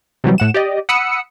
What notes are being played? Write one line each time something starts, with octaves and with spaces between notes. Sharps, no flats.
C3 E3 F#3 G3
A2 F#5 E7
G4 D5 D#5
F#5 B5 D#6 E6 C#7